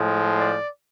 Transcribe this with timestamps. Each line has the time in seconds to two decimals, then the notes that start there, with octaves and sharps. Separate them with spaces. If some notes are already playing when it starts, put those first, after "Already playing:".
Already playing: A2 F3 G#3
0.37 D5